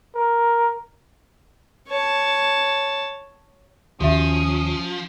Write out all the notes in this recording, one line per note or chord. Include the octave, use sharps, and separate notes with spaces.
A#4
C#5 A5
D#2 F3 C#4 F#4 G4 E5 D#6